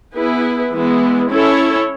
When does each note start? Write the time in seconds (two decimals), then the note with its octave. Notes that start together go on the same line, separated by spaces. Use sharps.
0.15 B3 E4 G#4 B4
0.72 E3 G#3 B3 E4
1.30 C#4 E4 A4 C#5